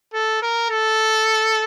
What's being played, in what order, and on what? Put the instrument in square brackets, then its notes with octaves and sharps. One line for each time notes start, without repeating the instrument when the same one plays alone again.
[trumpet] A4
A#4
A4